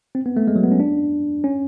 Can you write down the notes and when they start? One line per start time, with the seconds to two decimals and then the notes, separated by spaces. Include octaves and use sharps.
0.15 C4
0.26 B3
0.37 A3
0.48 G#3
0.56 F#3
0.63 B3
0.72 C#4
0.80 D4
1.44 C#4